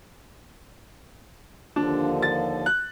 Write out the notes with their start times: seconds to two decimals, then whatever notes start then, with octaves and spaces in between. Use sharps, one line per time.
1.76 D#2 D3 F3 D4
2.22 A6
2.66 F#6